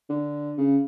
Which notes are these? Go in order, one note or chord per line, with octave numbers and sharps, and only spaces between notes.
D3
C#3